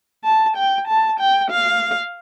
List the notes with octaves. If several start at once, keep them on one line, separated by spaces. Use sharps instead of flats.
A5
G5
A5
G5
F5